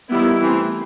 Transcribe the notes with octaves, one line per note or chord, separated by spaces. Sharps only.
D#3 G3 B3 E4
E3 A3 C4